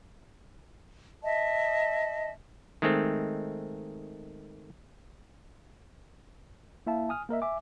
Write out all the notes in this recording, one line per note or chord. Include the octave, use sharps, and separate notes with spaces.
D#5 E5 A5
D#3 G#3 A3 C4
A#3 E4 E5 F5 A5
G#5 D#6 F6
A#3 A#4 D#5 E5
E5 G#5 D6